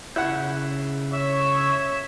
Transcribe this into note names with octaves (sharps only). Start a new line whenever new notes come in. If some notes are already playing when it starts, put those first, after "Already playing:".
C#3 E4 F#5 C#6 G6
C#5 E5